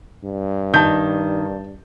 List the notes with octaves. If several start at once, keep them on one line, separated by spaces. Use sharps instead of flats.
G2
D#3 A5 G6